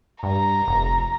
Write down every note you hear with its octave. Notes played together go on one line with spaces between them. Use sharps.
G2 A#5
F1